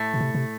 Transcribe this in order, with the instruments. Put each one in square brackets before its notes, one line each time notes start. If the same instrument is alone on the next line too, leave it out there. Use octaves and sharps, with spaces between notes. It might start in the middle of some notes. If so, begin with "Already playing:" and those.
Already playing: [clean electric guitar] A2 A3
[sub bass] B2
C3
C3